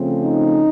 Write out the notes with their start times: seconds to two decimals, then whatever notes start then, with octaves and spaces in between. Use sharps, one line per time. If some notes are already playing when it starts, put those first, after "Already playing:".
Already playing: C#3 F3 A3 C4
0.24 D#4